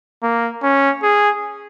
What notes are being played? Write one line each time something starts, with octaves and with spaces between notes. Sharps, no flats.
A#3
C#4
G#4